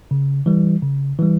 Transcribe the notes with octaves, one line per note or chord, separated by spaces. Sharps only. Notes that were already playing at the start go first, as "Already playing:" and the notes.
C#3
E3 G3
C#3
E3 G3